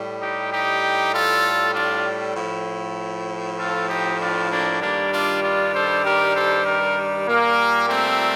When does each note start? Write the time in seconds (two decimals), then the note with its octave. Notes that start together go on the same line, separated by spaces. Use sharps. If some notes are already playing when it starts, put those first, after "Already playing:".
Already playing: A2 G3
0.20 D#4 G4
0.51 D#4 G4
1.12 F4 A4
1.74 D4 F4
2.35 A2 F3
3.58 F4 A4
3.88 D#4 G4
4.19 D4 F4
4.50 A#3 D4
4.81 G2 D#3 G3 A#3 D4
5.11 D4 F4
5.42 D4 F4
5.73 A4 C5
6.04 G4 A#4
6.34 A4 C5
6.65 G4 A#4
7.26 A#2 G3 A#3
7.88 A3 C4